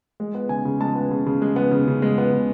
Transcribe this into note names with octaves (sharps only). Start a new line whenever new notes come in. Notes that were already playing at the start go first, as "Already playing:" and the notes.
G#3
B3
C#3 G#5
C#3
G#3 A5
B3
C#3
C#3
G#3
B3
C#3
C#3
G#3
B3
C#3